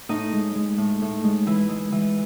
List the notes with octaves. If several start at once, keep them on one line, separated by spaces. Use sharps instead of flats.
A2 D#4
G#3
G#3
A2
A2
G#3
E3 E4
G#3
E3